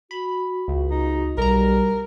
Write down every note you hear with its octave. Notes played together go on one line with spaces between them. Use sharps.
F#4 B5
C#2
D#4
B1 G3 A#4 A#5